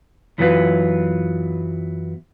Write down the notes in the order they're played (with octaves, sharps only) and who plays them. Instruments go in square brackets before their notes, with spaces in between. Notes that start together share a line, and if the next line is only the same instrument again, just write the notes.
[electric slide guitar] F#2 E3 F#3 B3 F4 B4